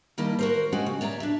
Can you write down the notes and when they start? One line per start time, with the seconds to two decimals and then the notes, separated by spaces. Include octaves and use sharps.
0.18 D#3 G3 A#3 E4 D#5 A5
0.39 F#4 A#4 C5
0.72 F3 G#3 C#4 F#4 G4
0.86 C#3
1.01 C#5 D5 E5 A#5
1.20 D4 E5